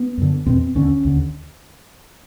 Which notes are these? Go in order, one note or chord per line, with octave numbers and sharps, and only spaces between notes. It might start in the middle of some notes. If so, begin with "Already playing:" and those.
Already playing: B3
F#2 D3
E2 B2 C4
D#2 D3 C#4
D#2 D3